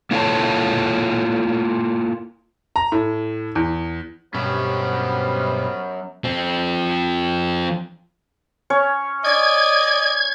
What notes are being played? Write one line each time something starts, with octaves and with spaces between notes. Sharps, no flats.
A#3 E4 F4 A4 C#5 A5
A#5
A2
E2
G2 B2 F#3 B3 C#4 G4 C5 F5
F3 C4
C#4 C#5
D5 D#5 G#6